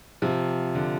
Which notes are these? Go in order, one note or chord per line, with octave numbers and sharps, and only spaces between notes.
C3 F3
D3